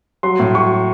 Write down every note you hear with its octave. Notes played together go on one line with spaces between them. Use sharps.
F#3 C6
A2
F#3 C#6